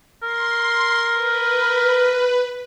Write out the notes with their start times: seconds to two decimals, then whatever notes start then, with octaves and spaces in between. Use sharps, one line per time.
0.22 A#4 C6
1.12 B4